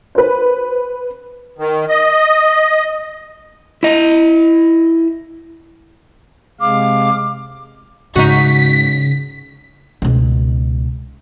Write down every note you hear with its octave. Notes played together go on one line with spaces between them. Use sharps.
B4 C5
D#3
D#5
E4 D#5
C3 G#3 F5 D6
G#2 C#3 D#4 F#4 B6
C#2 B2